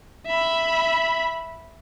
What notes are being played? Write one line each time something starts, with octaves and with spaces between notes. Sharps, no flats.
E5 B5